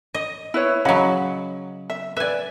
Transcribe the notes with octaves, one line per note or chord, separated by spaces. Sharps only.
D#5
E4 B4 C#5
C#3 F#3 D#5 F#5 B5
E5
B4 D5 E5 G#5